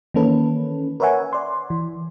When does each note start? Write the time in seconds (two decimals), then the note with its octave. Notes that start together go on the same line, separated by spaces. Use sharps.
0.14 D#3 E3 A#3 C#4 A4 B4
1.00 A#4 B4 C#5 E5 F#5 G#5
1.33 D5 C6
1.70 E3